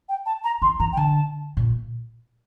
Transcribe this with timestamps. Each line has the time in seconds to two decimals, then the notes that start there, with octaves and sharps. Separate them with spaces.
0.08 G5
0.25 A5
0.44 A#5
0.62 E3 C6
0.79 E3 A#5
0.92 G5
0.97 D3 A5
1.57 A#2